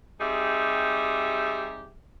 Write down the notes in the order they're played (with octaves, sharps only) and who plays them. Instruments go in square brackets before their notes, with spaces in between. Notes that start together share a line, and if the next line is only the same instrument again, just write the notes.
[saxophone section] G3 C4 D#4 G4 G#4 E5